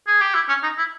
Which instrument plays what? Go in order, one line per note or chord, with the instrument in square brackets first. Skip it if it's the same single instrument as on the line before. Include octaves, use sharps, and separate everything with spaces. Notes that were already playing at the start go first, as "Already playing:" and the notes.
[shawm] G#4
G4
E4
C#4
D#4
E4